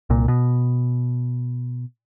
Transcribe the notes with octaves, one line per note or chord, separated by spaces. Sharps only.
C2 A#2
B2